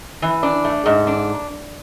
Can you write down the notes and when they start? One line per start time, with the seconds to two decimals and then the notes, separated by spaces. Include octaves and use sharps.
0.22 E3
0.43 D4
0.65 A3
0.86 G#2
1.07 D4